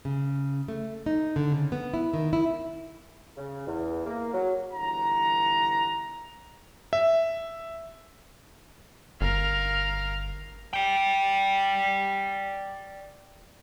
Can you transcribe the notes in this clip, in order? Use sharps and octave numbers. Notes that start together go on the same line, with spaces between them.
C#3
A3
D#4
D3
C#3
B3
E4
D#3
E4
C#3
E2
A#3
F#3
G1 E3 F#5 A#5
E5
G1 A#4 F5
D5 G5